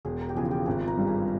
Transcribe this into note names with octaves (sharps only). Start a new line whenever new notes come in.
E1 G#4
A#4
G4
E2 C#3 F3 G#4
F4
G4
G#1 G#4
A#4
G2 G3 G4
G#4